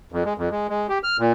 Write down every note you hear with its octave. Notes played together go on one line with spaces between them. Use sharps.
F2
G#3
F2
G#3
G#3
G4
F6
A#2